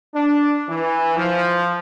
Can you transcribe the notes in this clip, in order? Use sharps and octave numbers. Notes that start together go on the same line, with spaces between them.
D4
E3
F3